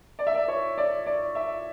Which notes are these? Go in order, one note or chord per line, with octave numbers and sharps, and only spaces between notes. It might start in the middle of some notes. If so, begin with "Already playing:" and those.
D5
E5
D5
C#5
D5
D5
E5